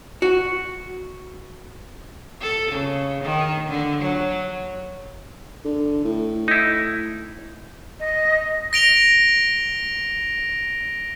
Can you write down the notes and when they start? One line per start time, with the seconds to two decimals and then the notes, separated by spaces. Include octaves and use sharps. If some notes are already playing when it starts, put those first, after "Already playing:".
0.22 F#4
2.41 A4
2.71 C#3
3.22 D#3
3.69 D3
4.01 F#3
5.65 D3
6.04 A2
6.48 D#4 E4
7.99 D#5
8.73 A#6 D7 F7 G7